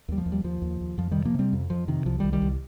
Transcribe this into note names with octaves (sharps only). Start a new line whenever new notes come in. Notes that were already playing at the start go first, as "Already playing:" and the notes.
D#2 G3
F3
D#2
G3
D#2 F3
D#2
D#2
F2 F3
C3 D#3 G3
F3 A#3
C3 G3 C4
F2
F2 F3
C3 D#3
C2 F3
C2 D#3 G3
D#3 G3
C2